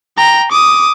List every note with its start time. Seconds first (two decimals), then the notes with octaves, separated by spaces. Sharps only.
0.18 G5 A#5
0.52 D6 D#6